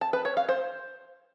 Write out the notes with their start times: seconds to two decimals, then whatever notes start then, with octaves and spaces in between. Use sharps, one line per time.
0.01 A5
0.13 B4
0.25 C#5
0.37 F5
0.49 C5